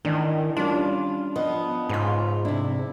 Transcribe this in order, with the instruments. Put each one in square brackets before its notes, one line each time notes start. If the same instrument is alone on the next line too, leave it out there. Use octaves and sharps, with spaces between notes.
[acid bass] D#3 [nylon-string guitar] E3 D4
[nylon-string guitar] G3 C#4 [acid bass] D4 [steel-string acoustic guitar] F4
[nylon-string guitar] F3 [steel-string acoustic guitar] B3 D#5
[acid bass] G#2 [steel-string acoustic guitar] C#3 F4
[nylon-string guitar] C3 D4 [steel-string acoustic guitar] E4